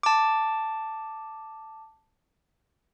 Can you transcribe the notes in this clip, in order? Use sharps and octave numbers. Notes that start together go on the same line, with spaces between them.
A5 D6